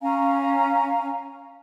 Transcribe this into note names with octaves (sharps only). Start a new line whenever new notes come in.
C#4 F5 G#5 A#5